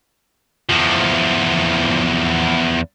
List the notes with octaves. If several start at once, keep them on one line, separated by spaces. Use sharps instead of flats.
E2 F3